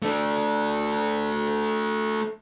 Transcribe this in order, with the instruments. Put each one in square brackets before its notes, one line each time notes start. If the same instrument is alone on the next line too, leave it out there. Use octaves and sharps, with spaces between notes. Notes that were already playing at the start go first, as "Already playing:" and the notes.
[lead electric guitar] A3 D4